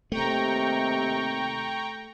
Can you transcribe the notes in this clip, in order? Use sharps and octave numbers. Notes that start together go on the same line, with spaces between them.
D#2 C3 A3 G5 A#5 C#6